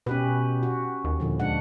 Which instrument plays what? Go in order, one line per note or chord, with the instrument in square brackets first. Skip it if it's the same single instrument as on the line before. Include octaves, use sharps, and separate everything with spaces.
[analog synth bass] B2 [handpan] C#4 G4 B4
[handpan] F#4
[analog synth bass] D#2
[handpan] A#2 D3 F3
G#3 D4 F#5